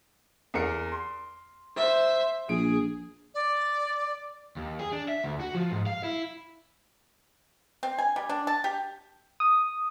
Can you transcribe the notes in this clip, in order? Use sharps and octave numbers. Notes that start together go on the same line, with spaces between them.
E2 A#4 C#7
C6
C5 E5
A#1 G#4 D7
D5
D#2
G#4
D4
E5
D2
F#4
F3
G#2
F5
E4
C4
G#5
G3
D4
A5
G4
D#6